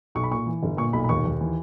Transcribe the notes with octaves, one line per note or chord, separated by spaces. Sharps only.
B1 C#6
B5
A#2 C#6
E3
G1
A#2 C#6
B1 B5
B5
D#2 C#6
D#2
E3